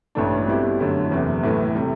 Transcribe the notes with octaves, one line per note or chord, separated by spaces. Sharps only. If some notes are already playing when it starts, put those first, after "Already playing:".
A1 G2 E3 A3 D4
B2 G3 C4 E4 G4
F#2 D3 A3 E4
F#1 E2 C3
A2 E3 A3
C3 G3